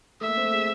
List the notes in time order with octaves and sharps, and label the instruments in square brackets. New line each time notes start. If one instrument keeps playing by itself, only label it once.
[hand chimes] A3 A4 [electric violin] E5
[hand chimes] A#3 A#4
C4 C5
A3 A4
G#4